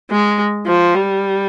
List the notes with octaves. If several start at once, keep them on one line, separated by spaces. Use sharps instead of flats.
G#3
F3
G3